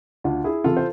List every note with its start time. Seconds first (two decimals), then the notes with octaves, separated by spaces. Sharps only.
0.24 D2 D4 F4
0.44 E4 G#4
0.64 C3 E3 F4 A4
0.77 C5